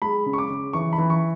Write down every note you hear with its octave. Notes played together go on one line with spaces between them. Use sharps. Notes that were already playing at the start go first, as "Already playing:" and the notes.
G#3 B5
C#3
C#6
D6
C#3
E3 C#6
B5
E3
C#6